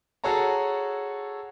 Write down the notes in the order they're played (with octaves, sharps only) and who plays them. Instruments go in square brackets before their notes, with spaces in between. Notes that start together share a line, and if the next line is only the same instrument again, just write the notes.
[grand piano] F#4 G#4 A4 C#5 A5 A#5